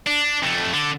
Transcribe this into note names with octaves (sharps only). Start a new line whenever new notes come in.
D4
F2 A3
D3